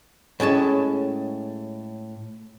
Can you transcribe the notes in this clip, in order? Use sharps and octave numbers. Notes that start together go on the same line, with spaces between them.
A2 G#3 C#4 A5